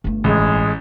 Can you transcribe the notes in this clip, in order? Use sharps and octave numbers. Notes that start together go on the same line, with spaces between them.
G1 A3
A1 G#3